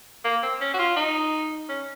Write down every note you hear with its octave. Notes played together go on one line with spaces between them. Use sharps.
A#3
C4
C#4
F#4
F4
D#4
C#4